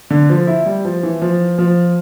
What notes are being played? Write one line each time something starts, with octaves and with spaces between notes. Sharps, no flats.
D3
F3
E4
G3
F3
E3
F3
F3